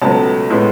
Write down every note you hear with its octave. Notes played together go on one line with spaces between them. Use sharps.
C#2 B2 F#3 A3 A5
A2 G#3 B3